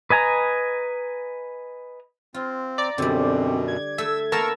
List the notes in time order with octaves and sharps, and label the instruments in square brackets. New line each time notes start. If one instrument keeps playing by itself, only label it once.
[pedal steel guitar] B4 D#5 G#5 A#5
[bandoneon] C4 [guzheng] F4
[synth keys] D5 [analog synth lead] A#5
[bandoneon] F#2 B2 [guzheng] D3 G3 [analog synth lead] C4
[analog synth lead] G#6
[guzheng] A3 [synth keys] E5 [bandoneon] E6
[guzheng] A#3 B3 [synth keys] A#4 A5 E6 [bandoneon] C#6